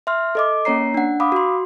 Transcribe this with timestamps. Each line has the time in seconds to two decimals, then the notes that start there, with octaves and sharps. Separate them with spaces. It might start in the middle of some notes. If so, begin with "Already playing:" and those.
0.07 E5 C6 F6
0.35 A4 D#5 D6
0.65 A#3 C#4 C#5 A#5 C7
0.94 D4 F#5
1.20 F5 B5 D6 D#6
1.32 F#4 C6